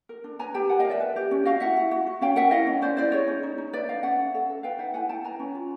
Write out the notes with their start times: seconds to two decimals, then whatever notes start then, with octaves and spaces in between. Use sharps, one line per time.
0.09 A#4
0.24 D4
0.39 B4 G#5 A#5
0.54 G4 G5 A5
0.69 A#4 F#5 G#5
0.80 D#5 F5
0.85 A#4
0.90 D5 E5
1.00 B4
1.16 G4
1.31 C#4
1.45 F#4 D#5 F5
1.60 E4 E5 F#5
1.76 E4
1.91 F#4
2.06 F#4
2.21 C#4 F5 G5
2.36 A#4 E5 F#5
2.51 E4 D#5 F5
2.67 C#4
2.82 C#4 C5 D5
2.97 E4 C5 D5
3.12 G#4 C#5 D#5
3.28 C#4
3.43 D#4
3.58 D#4
3.73 B4 D5 E5
3.88 D4 D#5 F5
4.03 C#4 E5 F#5
4.19 C#4
4.34 A4
4.50 A4
4.63 B4 F5 G5
4.79 D#4 E5 F#5
4.94 E4 F#5 G#5
5.09 E4 G5 A5
5.24 B4 G#5 A#5
5.39 C#4
5.55 F4